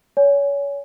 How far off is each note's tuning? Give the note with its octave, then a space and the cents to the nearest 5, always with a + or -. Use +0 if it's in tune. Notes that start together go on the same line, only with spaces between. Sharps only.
C#5 +30 G#5 +0